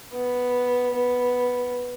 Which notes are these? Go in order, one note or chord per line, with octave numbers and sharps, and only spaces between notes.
B3
B3